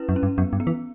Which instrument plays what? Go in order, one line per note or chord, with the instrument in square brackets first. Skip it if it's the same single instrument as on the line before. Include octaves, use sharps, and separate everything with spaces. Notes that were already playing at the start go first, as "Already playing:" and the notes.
Already playing: [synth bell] C#4 E4 B4
[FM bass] F#2
[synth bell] C#4
[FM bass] G2
[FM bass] F#2 [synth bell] B3
[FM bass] G2
[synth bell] B3
[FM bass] E3